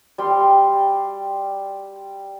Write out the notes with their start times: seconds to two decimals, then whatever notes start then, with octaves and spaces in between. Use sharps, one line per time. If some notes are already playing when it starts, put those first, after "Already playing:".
0.18 G3 C6